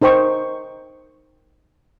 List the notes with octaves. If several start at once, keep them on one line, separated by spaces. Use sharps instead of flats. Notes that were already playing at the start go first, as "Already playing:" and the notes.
D#4 A#4 C5 G5 C#6 D#6